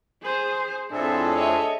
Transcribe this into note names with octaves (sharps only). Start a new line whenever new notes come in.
G#4 C5
F2 A2 C4 D4 G#4 A4 E5
C#5 D#5 E5